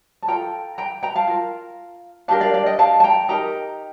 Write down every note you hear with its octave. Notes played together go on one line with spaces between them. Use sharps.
A5
F4 A4 G5 A#5
G5 A#5
G5 A#5
F5 A5
F4 A#4
D4 G4 A#4 F5 A5
D5 F5
D5 F5
D#5 G5
F5 A5
A5
G5 A#5
D#4 G4 A#4 G5 A#5